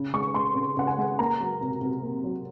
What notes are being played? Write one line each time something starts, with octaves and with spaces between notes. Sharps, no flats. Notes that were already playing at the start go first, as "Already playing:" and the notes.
Already playing: C#3
G#3 C#6
G#3 C6
C#3
C#3 F#5
G#5
G#3
A#3 A#5
F#3
C3
C3
A#3
F#3